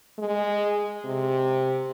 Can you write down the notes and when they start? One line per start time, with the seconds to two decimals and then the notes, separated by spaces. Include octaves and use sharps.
0.18 G#3
1.05 C3